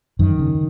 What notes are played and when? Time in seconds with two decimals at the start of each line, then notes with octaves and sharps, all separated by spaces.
0.19 F#2 D#3
0.39 C#3